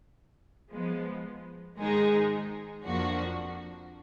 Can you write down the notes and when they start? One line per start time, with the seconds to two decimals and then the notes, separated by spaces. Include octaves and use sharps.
0.72 F3 G#3 B3
1.78 G#2 D#3 G#3 D#4 G#4
2.84 F2 F3 A#3 D4 F#4